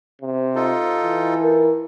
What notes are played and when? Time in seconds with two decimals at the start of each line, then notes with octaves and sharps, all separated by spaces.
0.22 C3
0.55 D#4 F4 A4
1.03 E3
1.42 A#4